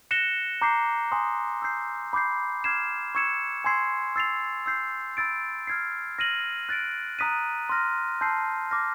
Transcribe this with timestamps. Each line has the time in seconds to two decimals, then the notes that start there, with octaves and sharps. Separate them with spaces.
0.11 F#6 A#6 C#7 E7 G7
0.62 A#5 D6 G6 C7
1.12 G#5 C6 D#6
1.62 E6 G6 C7
2.13 B5 D6 G6 C7
2.64 D6 F6 G#6 C7 E7
3.15 C#6 E6 G#6 C#7 E7
3.64 G#5 C6 E6 G#6 C7
4.16 E6 A6 C7 F7
4.66 E6 G6 C7
5.17 B5 E6 A6 D7
5.67 F6 G#6 C7
6.19 F6 A#6 D#7 F#7
6.69 F#6 A6 D7
7.19 A#5 D#6 F#6 B6 D#7
7.69 C6 F6 A#6
8.21 A5 C6 E6 G6 C7
8.71 D6 F6 A#6